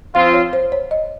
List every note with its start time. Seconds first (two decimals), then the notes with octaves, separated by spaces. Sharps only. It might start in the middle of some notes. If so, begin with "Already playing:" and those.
0.15 F3 C4 F4 F5
0.34 C#5
0.53 C5
0.72 C#5
0.91 D#5